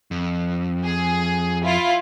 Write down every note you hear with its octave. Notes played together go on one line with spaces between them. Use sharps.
F2
G#4
E4 F4